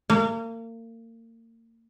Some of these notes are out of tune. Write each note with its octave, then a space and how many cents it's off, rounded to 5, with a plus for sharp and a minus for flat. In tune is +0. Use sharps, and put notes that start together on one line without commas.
A#3 -35